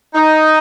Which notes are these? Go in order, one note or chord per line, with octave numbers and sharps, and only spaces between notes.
D#4